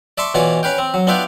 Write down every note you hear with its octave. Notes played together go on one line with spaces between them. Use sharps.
D5 E5 A5 C6 C#6
B2 E3 F4 C#5 D5 G#5
C#4 B4 F5 G5
C4
F#3
B3 D4 F4 E5 F5 G5